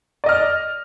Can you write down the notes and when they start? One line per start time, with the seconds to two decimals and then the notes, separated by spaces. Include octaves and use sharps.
0.24 D5
0.26 D#5
0.29 F6